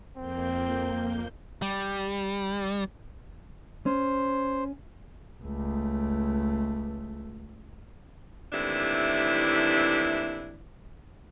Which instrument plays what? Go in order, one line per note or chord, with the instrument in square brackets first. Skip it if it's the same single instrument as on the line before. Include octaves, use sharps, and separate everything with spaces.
[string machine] F2 A#3 G6 [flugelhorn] C4
[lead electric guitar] G3
[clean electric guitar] C#4 [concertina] C5
[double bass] C#2 A3
[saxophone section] D#2 C3 E3 A3 D4 E4